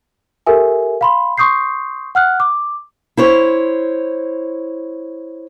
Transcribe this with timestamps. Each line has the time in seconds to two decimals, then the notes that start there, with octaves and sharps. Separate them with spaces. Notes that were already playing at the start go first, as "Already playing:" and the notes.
0.46 G4 A4 A#4 E5 G#5
1.01 F5 B5 C6
1.38 C6 C#6 D#6 G6 C7
2.15 F#5 F6 F#6
2.40 D6
3.17 E4 C5 C#5